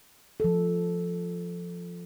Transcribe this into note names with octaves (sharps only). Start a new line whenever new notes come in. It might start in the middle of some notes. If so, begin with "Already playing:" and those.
F3 A4